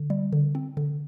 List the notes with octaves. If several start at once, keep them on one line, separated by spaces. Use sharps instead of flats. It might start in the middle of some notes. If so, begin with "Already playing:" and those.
Already playing: D3
G3
D3
C4
D3